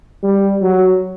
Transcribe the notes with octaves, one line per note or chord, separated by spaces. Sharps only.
G3
F#3